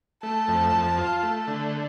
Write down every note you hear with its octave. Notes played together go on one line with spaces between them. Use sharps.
A3 A5
F2
F2
F4
A3
D3